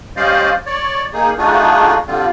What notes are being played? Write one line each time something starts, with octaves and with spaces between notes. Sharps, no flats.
G3 C#4 C5 D5 D#5 F5
C#5 D5
A#3 D#4 G#4
A3 D4 D#4 F4 F#4 G#4
D3 G3 C4 F4